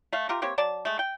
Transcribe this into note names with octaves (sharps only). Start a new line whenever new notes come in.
A3 F5
F4 G4 A#4
A#3 C4 G4 C#5
F#3 D5 A5
G#3 A3
G5